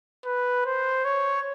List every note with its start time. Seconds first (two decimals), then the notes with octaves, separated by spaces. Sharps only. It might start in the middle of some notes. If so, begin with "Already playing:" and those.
0.25 B4
0.65 C5
1.04 C#5